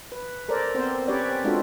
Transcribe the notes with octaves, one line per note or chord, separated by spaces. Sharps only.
B4
A4 A#4 C5 D5
B3 C4 C5
C#4 G4 B4 C#5 D5
G#3 D4 F4 F#4 A4